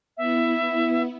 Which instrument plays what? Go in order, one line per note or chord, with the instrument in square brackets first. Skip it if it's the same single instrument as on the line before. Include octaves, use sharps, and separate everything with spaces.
[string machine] B3 E4 [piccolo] E5